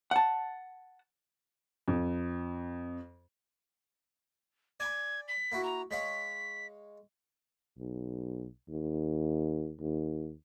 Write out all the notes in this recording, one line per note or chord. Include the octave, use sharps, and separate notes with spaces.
F#5 A5
F2
D5 G#5 B5 G#6
B6
A#3 E4 F#4
A#5
G#3 C#5 F5 B6
B1
D#2
D#2